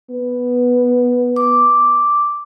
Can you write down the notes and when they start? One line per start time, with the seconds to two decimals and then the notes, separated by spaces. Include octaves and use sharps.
0.10 B3
1.36 D6